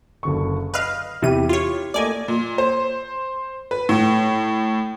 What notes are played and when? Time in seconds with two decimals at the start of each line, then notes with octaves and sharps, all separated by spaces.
0.23 F#1 D3 C#6
0.74 B4 D#5 F5 F6
1.22 E2 C3 E4 G4 D#7
1.49 F4 C#5
1.94 A3 A#3 D5 D#5 G#5
2.28 A#2
2.58 C5
3.71 B4
3.89 A2